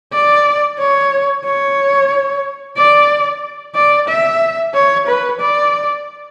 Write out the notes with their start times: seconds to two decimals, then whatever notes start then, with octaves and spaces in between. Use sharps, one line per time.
0.13 D5
0.79 C#5
1.45 C#5
2.77 D5
3.75 D5
4.08 E5
4.74 C#5
5.07 B4
5.40 D5